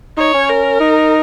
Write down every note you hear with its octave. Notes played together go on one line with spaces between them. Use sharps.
D#4 C#5
C#4
A#4
D#4